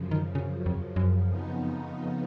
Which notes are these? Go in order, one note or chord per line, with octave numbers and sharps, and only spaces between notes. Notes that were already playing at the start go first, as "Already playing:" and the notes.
Already playing: F#2 C#3 F3
D#3
C#3
F2
F#2
F2 C#3 F3 B3 D#4